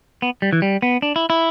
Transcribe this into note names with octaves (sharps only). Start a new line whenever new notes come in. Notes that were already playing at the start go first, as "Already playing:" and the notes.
B3
G3
E3
G3
B3
D4
E4
E4